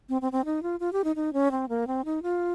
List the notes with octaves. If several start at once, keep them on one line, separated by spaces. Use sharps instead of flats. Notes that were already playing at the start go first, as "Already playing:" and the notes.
C4
C4
C4
D#4
F4
F4
G4
D#4
D#4
C#4
C4
A#3
C4
D#4
F4